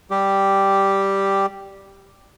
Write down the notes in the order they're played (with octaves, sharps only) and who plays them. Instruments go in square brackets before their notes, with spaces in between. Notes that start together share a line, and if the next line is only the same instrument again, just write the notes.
[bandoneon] G3 G4